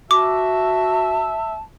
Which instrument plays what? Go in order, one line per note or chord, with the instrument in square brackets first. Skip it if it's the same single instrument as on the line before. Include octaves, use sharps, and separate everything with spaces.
[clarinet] F#4 [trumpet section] E5 [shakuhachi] A5 [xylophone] D6